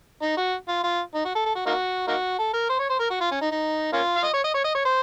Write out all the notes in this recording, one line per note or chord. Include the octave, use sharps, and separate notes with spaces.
D#4
F#4
F4
F4
D#4
F#4
A4
A4
F#4
A#3 D#4 F#4
A#3 D#4 F#4
A4
A#4
C5
C#5
C5
A#4
F#4
F4
C#4
D#4
D#4
A#3 C#4 F4
F5
D#5
C#5
D#5
C#5
D#5
C#5
C5